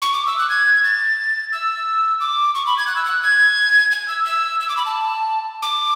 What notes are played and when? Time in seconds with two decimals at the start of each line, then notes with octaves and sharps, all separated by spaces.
0.02 C#6
0.14 D6
0.26 E6
0.39 F#6
0.49 G#6
0.84 A6
1.52 E6
2.20 D6
2.55 C#6
2.67 B5
2.78 G#6
2.87 F#6
2.96 E6
3.05 F#6
3.23 G#6
3.92 G#6
4.08 E6
4.25 E6
4.60 E6
4.69 D6
4.77 B5
4.86 A5
5.62 D6